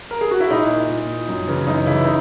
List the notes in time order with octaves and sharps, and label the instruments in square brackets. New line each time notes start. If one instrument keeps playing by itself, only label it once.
[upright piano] A#4
G#4
F#4
E4
A#2 D#4
A#2
F#2
C#3 E3
F#2 D#4
C#3 E3 E4
D#4